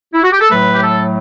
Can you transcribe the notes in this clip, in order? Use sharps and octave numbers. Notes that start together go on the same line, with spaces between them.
E4
F#4
G4
A4
A2 F#3 A3 B4
G4
A4